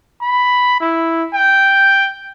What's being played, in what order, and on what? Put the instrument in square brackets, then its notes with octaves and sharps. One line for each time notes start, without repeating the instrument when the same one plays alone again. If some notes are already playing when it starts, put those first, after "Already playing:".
[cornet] B5
E4
G5